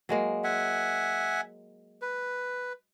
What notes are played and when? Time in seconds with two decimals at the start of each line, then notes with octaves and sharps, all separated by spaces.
0.09 F#3 G#3 A#3
0.44 E5 F#5 G#5
2.02 B4